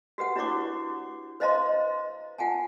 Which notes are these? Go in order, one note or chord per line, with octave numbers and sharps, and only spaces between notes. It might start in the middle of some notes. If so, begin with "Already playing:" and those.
F#4 G4 B4 F#5
D4 E4 F#4 C#5 C#6 D6
B4 C5 D#5 F5 A#5 C6
F4 F#5 G#5 A5